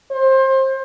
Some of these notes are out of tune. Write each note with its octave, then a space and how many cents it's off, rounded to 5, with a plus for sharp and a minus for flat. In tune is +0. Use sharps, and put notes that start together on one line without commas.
C5 +25